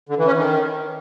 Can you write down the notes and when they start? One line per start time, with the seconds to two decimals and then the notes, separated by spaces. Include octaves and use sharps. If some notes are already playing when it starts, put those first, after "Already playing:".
0.09 D3
0.18 E3
0.27 C#4
0.35 D#3